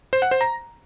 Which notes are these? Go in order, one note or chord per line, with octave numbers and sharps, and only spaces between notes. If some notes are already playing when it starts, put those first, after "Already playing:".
C5
F#5
C5
A#5